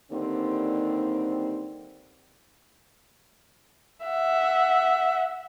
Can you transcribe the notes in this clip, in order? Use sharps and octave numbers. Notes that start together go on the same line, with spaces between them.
D#2 D3 G3 C4
E5 F#5